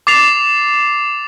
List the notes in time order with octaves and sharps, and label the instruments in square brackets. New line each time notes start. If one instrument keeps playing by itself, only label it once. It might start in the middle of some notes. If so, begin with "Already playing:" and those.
[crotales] D6 A6 C7 F7